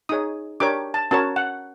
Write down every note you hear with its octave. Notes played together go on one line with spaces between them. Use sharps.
D#4 G#4 C#5 D#6
D4 G4 A#4 C#5 D6
A5
C#4 F#4 A#4 C#5 A5
F#5